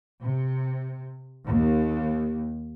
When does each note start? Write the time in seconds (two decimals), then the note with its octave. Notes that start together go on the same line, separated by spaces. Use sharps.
0.23 C3
1.46 D#2